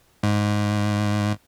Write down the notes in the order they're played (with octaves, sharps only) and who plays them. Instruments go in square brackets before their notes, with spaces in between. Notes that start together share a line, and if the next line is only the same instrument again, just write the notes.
[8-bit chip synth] G#2